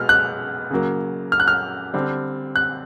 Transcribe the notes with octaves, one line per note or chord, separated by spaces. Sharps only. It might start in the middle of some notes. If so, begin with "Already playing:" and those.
Already playing: B2 G#3 B3 F6
F#6
C#3 F#3 A#3
F6
F#6
F6
D3 G3 C4
F#6